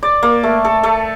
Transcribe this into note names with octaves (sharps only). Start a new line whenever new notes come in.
D5
A#3
A3
A4
A3